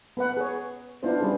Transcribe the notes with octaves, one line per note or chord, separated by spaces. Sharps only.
B3 B4 F#5
G#4 C#5
B3 D4 E4 F4 C5
G3 C#4 D4 G#4 B4